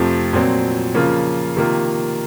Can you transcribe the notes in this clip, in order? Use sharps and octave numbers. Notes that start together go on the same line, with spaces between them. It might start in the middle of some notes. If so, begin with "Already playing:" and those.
Already playing: F2 C3 F3 A3 C4
A#2 F#3 C4
C#3 F3 A#3 F4
C3 D#3 A#3 F4